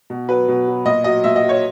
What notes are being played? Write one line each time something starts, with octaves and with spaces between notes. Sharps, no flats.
B2
F#3 B4
B2
F#3
A#2 D#5
F#3 D#5
A#2 E5
D#5
F#3
C#5